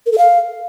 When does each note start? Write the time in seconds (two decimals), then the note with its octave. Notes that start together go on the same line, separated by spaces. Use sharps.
0.06 A#4
0.12 A4
0.18 F5